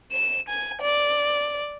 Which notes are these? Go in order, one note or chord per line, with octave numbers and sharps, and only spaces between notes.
E7
G#5
D5